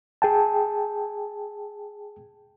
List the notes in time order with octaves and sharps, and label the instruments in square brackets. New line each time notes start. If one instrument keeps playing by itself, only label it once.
[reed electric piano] G#4 G5 A5